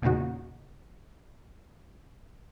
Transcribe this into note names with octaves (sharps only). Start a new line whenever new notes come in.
E2 A#2 C#3 D#4 F#4